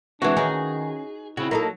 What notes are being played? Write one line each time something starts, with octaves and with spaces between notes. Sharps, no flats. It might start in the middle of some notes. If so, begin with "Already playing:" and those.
E3 G#3 C4 D4 E4 F#4
D#3 C#4 D#4 G#4
C#3 C4 E4 F#4
F#3 A#3 D#4 A4